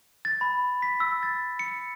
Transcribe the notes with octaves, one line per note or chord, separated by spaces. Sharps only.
A6
B5
B6
E6
A6
C#7